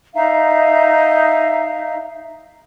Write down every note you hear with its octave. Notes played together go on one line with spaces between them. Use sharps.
D#4 E5 F5 A#5